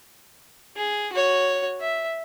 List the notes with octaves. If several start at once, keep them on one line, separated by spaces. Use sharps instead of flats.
G#4
F#4 C#5
E5